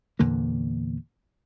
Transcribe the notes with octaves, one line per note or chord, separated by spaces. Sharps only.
E2 A#2 D3 A#3